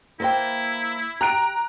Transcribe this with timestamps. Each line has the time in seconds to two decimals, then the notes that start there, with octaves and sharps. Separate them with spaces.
0.20 A#3 E4 C5 G5
1.21 G4 A#5 F#6 D7